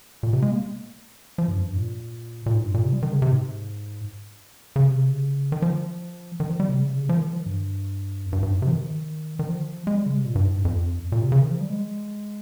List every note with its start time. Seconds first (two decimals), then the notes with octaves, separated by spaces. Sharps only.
0.23 A#2
0.33 C3
0.42 G#3
0.51 A#3
1.38 F3
1.48 G2
1.58 F2
1.68 G2
1.77 A#2
2.46 A#2
2.54 G#2
2.64 G2
2.74 A#2
2.83 C3
2.93 G3
3.02 D#3
3.12 C#3
3.22 C3
3.32 G#2
4.76 C#3
4.86 C3
5.06 C#3
5.52 D#3
5.62 F3
6.40 D#3
6.49 F3
6.60 G3
6.69 C3
6.78 C#3
6.86 C3
6.94 C#3
7.09 F3
7.17 D#3
7.27 F3
7.36 D#3
7.46 G2
8.26 F2
8.33 G2
8.43 G2
8.52 G#2
8.62 C3
8.67 F3
8.72 D#3
9.39 D#3
9.49 F3
9.87 G#3
9.97 G3
10.06 C#3
10.16 C3
10.25 A#2
10.35 G2
10.45 G#2
10.55 G2
10.65 F2
11.12 A#2
11.22 C3
11.32 C#3
11.41 D#3
11.51 F3
11.61 G3
11.70 G#3